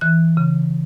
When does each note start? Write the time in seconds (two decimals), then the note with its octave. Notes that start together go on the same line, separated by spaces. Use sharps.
0.01 E3 F#6
0.37 C#3